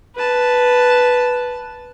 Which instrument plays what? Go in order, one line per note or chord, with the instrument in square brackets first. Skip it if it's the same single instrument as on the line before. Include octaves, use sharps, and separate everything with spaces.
[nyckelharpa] B4 A5